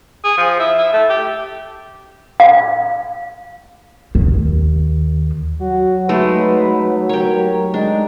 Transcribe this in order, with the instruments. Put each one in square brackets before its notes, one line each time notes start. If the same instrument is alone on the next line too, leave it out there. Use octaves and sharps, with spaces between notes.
[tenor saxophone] G#4
F3
E4
E4
A3
G4
[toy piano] F5
[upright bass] D#2
[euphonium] F#3 [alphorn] F#4
[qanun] G#3 A3 D#4 [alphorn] B4
[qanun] G4 C#5 [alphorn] A#4
[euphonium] G#3 [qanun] D4 [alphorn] D#4